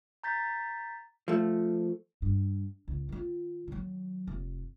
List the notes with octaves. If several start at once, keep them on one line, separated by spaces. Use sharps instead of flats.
A#5 G6 A6 B6
F3 A3
G2
C#2
D#3 F4
D#3 F#3
F1